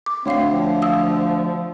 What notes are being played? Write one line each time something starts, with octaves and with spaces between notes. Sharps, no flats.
D6
D2 C4 C#5 F5 C7
F3
F5 D#6 E6